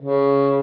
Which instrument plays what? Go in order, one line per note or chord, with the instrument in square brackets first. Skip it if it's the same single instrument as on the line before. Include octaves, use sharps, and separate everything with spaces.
[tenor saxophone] C#3